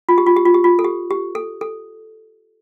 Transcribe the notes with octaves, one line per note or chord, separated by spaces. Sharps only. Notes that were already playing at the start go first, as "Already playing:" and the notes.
F4
G4
F4
G4
F4
G4
F4
A4
G4
G4
A4
A4